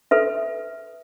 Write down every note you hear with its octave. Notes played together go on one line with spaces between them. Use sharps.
A4 B4 E5